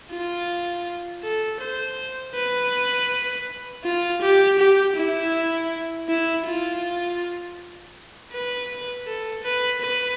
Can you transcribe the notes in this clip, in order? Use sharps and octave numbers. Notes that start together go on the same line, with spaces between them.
F4
A4
C5
B4
F4
G4
G4
E4
E4
F4
B4
A4
B4
B4